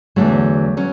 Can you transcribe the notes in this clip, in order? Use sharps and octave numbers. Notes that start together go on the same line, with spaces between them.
E2 D3 F#3 A3
F#3 C#4